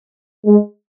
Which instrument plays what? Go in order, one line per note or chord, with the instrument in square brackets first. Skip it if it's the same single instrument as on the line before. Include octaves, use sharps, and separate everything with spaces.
[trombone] G#3